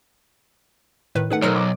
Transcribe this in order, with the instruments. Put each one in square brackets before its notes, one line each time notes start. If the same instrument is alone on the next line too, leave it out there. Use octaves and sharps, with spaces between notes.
[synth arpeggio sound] A2 D#3 B4
[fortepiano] D#3 A3 [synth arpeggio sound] G#4 B4 F#5
[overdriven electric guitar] B1 [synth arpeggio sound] D#4 F6 F#6 [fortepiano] A4 A#4 C5
[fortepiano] D6